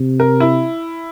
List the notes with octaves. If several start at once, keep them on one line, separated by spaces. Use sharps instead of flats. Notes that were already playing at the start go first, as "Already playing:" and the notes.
Already playing: C3
A#4
E4